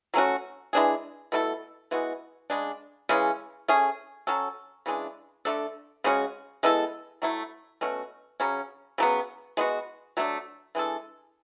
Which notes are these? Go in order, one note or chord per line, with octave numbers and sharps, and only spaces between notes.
F#3 A3 C#4 F#4
E3 G#3 D4 G#4
B2 A3 E4 A4
E3 G#3 B3 F#4
C#3 G#3 D4
C#3 E3 G#3 C#4
A3 C#4 G#4
F#3 C#4 F#4 A4
C#3 E3 G#3 D4
D3 A3 D4 A4
C#3 G#3 C#4 F#4
G#3 B3 E4 A4
F#3 A3 E4
B2 A3 C#4 F#4
C#3 F#3 C#4
C#3 F#3 B3
G#3 B3 F#4
F#3 A3 D4
E3 G#3 D4 A4